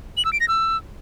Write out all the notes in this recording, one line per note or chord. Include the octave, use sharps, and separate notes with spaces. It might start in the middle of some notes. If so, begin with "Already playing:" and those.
F#7
E6
D7
A#6
E6